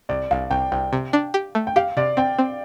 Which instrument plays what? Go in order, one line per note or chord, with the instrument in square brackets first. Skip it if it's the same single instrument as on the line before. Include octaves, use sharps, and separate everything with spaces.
[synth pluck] C2 [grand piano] D5
[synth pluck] C2 [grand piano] F5
[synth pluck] C2 [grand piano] G5
[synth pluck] C2 [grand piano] G5
[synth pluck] C3
D4
G4
A3
[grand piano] G5
[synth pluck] G4 [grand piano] F5
[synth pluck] C3 [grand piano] D5
[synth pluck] C4 [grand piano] G5
[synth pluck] C4